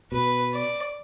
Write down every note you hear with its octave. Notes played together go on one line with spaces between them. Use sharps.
B2 B4
D5